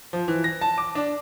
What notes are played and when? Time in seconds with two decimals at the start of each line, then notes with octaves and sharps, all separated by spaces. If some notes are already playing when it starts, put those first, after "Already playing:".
0.13 F3
0.28 E3
0.44 A#6
0.61 A5
0.78 D6
0.95 D4